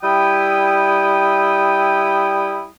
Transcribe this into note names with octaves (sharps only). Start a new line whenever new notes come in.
G3 E4 G5 D#6